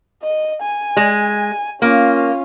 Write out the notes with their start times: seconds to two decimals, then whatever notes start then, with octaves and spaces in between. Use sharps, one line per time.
0.23 D#5
0.62 G#5
0.97 G#3
1.82 A#3 C#4 F4